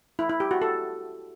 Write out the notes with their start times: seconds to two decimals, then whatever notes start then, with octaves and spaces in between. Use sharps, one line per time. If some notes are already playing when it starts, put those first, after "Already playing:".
0.19 E4
0.30 E4
0.40 G4
0.51 F#4
0.62 A4